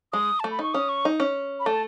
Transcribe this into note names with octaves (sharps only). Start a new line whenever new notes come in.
G#3 D#6
A3 A5
B5
D#4 C#6
C#4 D#6
C#6
D#4
C#4
B5
A3 A5